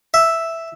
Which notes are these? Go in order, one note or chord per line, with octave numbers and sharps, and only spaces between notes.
E5